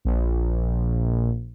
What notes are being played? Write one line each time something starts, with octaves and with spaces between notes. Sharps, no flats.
A#1